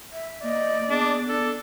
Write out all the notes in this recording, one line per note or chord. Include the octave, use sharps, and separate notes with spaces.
E5
A#3 D5 D#5
B3 D4 G#4
D4 A4